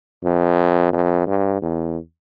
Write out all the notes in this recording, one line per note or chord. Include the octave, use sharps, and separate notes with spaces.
F2
F2
G2
E2